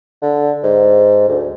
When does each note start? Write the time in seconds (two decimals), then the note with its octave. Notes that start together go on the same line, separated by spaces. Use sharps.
0.22 D3
0.64 G#2
1.29 D2